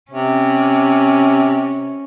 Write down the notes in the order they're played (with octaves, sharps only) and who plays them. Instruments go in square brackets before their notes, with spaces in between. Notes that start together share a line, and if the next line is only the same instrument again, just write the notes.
[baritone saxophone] C3 [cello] C#4